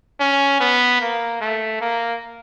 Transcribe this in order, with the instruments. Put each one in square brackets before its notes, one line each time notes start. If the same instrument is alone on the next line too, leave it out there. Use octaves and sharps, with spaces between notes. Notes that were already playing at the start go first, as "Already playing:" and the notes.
[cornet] C#4
B3
A#3
A3
A#3